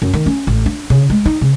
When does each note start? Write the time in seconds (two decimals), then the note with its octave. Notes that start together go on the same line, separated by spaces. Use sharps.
0.02 F#2
0.14 D#3
0.26 C#4
0.47 A1
0.66 D4
0.90 C#3
1.10 G#3
1.26 D#4
1.41 C#3